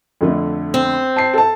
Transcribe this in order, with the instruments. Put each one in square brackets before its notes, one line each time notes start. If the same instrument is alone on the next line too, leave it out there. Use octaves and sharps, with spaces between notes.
[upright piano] F2 D3 A3
[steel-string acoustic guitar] C4
[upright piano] A5 C7
A4 A5